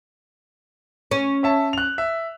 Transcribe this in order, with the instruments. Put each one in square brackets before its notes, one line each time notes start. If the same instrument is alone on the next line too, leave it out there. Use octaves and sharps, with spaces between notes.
[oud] C#4
[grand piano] C#5 E5 A5
F#6 F7
E5